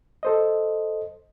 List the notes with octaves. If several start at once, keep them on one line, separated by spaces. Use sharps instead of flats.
A4 C5 D#5